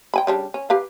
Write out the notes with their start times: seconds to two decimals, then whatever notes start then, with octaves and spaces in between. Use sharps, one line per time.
0.14 G5 G#5 B5
0.27 C#3 G3 D4
0.54 C#4
0.70 G4 B4 F5